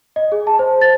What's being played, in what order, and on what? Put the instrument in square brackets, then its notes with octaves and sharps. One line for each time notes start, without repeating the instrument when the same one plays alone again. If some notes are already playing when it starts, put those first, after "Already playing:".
[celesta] D#5
G#4
A5
C5
A6